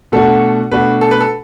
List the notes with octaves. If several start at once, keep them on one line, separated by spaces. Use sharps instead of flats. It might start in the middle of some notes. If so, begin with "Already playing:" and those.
B2 A3 D4 F#4 A4
B2 A3 D4 F#4 B4
A4
B4
A4